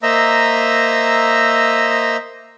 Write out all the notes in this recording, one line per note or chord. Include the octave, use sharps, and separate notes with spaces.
A#3 C5 D#5 E5 A#5 E6